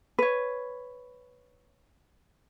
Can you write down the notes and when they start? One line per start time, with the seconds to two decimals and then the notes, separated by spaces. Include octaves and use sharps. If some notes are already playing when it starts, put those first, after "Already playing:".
0.19 B4 C#5